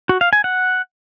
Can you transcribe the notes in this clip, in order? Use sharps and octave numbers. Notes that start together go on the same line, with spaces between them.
F#4
F5
G#5
F#5